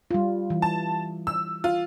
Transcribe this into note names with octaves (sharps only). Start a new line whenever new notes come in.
G3 F4
E3
A5
E6
F4